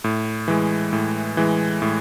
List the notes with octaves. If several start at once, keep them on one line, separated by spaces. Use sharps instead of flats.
A2
E3 G#3
A2
E3 G#3
A2